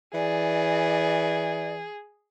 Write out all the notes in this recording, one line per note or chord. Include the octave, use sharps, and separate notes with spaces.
E3 G#4 D5